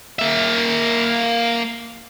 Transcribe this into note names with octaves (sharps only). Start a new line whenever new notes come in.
A#3 E5